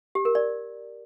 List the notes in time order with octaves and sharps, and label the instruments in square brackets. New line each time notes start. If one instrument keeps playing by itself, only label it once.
[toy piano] G4
A#4
D5